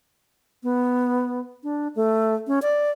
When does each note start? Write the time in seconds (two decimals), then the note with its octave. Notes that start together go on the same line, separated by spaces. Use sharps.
0.63 B3
1.63 D4
1.96 A3
2.47 C#4
2.62 D5